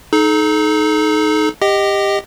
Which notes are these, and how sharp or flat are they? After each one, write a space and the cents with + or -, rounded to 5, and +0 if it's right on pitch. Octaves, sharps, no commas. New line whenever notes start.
D#4 +0 A4 -40
G4 +20 D#5 +0 G5 -30